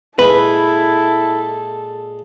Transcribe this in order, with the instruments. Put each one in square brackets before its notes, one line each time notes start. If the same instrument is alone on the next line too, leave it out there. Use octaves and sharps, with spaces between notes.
[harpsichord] A#2 G#3 [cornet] E4 [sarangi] A4 [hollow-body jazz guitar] B4